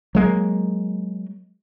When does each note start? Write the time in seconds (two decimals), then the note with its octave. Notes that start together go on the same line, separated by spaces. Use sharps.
0.15 F#3 G#3 A#3